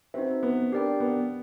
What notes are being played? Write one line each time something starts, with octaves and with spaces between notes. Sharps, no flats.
C4 D#4 F#4 B4 E5
B3
D4 G4 A#4 D5 G5
B3